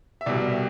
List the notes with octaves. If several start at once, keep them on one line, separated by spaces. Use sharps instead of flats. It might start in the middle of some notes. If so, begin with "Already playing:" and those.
E5
C2 B2 G3 D5